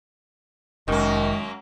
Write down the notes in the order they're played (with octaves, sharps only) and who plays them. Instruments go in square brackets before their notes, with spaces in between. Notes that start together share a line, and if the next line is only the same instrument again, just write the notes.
[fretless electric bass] F1 [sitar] F#2 A#3 [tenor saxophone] D#3 [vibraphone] G#3 C#6